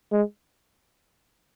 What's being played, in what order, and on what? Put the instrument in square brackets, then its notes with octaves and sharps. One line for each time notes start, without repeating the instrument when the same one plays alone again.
[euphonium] G#3